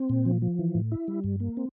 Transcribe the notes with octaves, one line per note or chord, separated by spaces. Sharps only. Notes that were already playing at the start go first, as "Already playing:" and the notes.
Already playing: C4
A#2
F3
F3
E3
A2
E4
G3
G2
A#3
C4